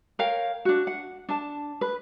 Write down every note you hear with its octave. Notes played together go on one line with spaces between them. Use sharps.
A#4 C#5 F5 G5
D4 F#4
F#5
D4 A5
B4